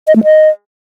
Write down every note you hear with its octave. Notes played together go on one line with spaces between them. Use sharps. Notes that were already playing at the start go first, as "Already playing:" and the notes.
D#5
A3
D#5